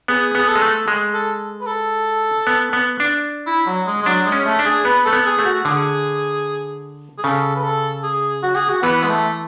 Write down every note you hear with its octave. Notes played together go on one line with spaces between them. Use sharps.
B3 G#4
B3 G#4
A4
G#3
A3
G#3
A4
B4
A4
B3
B3
D4
E4
F#3
G#3
G#3
F#3 D4
G#3
C#4
A3
D4
G#4
B3 B4
A3 A4
B3
G#4
A3
F#4
D3 G#4
G#4
C#3 A4
B4
A4
G#4
F#4
G#4
F#4
E3 B3
G#3
A3